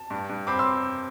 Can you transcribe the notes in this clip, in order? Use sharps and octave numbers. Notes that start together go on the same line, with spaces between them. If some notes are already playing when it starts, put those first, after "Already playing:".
Already playing: A5
G2
G2
C4 B5 D6
C6 E6